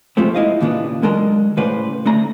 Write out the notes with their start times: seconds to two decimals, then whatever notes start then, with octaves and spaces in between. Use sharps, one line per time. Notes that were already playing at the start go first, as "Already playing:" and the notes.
0.17 G2 C3 F3 G#3 A3 C4
0.35 B3 E4 D#5 F5
0.61 D#2 A#2 C#3 B3 D4
1.02 D#3 F#3 G#3 D4 A4 A#4
1.57 A2 C#3 B4 C5 D5 F#5
2.06 D3 A3 D5 A#5